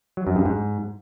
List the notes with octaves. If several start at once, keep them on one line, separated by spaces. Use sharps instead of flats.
F#3
F#2
G2
G#2